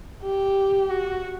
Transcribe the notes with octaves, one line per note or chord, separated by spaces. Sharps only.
G4
F#4